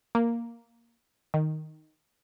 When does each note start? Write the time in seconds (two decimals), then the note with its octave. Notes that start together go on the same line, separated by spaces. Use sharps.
0.15 A#3
1.34 D#3